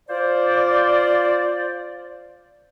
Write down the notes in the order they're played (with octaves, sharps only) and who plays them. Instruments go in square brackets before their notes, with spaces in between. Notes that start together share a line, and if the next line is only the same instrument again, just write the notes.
[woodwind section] F4 C5 D5